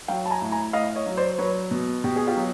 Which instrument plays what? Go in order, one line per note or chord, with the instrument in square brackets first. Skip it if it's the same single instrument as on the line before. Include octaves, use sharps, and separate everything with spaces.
[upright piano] F#3 F5 G5
A5
G#5 A#5
A2
G#5 A#5
A2 D#5 F5
C#5 D#5
F#3
C5 D5
F#3 B4 C#5
B2
B2 G4
G#4
F4 G4
F#3